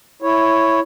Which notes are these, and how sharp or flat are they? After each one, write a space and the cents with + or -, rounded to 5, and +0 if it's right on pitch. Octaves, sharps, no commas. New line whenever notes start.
E4 +0 C#5 +0